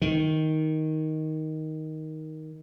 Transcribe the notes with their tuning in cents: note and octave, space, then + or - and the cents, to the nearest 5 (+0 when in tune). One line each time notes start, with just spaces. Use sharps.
D#3 +10